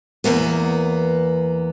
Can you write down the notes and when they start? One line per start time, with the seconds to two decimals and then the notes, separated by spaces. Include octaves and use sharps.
0.24 E2 G2 A#3 B3